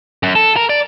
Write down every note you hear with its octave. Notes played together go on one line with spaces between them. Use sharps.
F#2
A4
A#4
D5